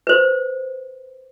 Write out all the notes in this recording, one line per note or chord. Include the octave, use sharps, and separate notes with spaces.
B4 C5